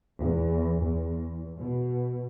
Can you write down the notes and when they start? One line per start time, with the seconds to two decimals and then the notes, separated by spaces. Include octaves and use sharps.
0.20 E2
0.84 E2
1.58 B2